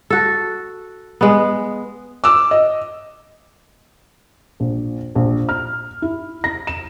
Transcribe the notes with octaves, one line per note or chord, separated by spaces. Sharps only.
F#4 A4
G#3 B3
D6 E6
D#5
A#1
A#1
F6
E4
A#6
E7